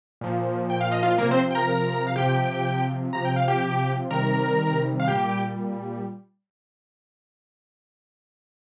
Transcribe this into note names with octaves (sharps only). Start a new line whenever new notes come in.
A#2 F3
G5
F5
D#5
F4 F5
C3 F3 A#3 A#4
C4 C5
G5
A#4 A#5
A#4 A#5
F5
C3 F3 G4 G5
C3 F3 A#5
G5
F5
G4 G5
C3 D#3 G3 A#4 A#5
F5
A#2 G3 G4 G5